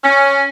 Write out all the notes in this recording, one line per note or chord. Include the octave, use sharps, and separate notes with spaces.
C#4